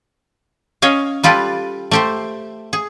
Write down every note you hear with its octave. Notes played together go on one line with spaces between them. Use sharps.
C#4 C#5 D#5 F5
G3 F4 G4 A4 B4
A3 G4 C5
G#4